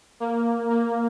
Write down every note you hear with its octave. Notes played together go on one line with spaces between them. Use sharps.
A#3
A#3